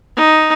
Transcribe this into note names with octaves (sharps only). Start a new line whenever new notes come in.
D#4